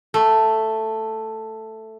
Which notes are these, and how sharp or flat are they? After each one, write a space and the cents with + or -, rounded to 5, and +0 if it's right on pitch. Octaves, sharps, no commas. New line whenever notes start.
A3 +5